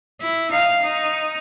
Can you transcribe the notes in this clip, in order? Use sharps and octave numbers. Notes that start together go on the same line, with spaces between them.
E4
D#4 F5
D#4